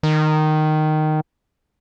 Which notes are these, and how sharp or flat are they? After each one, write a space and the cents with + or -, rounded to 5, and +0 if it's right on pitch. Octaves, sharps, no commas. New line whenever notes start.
D#3 -10